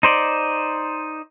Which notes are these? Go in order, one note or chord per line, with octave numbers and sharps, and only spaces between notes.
D#4 C5 D5